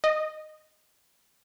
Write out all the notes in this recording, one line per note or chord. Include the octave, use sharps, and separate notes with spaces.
D#5